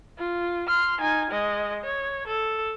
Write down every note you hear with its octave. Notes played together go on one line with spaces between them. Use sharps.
F4
C6 F6
D#4 G#5
G#3 D#5
C#5
A4